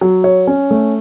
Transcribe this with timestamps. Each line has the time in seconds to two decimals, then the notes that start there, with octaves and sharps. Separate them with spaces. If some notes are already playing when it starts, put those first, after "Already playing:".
0.01 F#3
0.24 C#5
0.47 C#4
0.71 A3